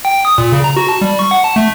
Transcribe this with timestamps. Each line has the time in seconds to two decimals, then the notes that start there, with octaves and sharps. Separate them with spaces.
0.05 G5
0.25 D#6
0.38 A#2
0.52 C#3
0.64 A#5
0.77 F#4
0.89 A5
1.01 G3
1.19 C#6
1.31 F#5
1.44 A5
1.56 A3